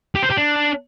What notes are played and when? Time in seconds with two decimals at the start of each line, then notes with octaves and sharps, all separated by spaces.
0.15 G4
0.22 C5
0.30 G4
0.37 D4